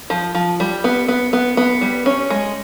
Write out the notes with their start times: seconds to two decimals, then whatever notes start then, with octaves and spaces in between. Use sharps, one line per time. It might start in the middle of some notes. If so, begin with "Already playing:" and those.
0.10 F3
0.35 F3
0.60 G3
0.84 B3
1.08 B3
1.33 B3
1.57 B3
1.81 G3
2.06 C#4
2.30 G#3